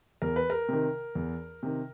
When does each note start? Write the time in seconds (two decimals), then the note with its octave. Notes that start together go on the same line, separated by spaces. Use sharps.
0.22 E2 A#4
0.36 B4
0.50 A#4
0.69 C3 D#3
1.15 E2
1.63 C3 D#3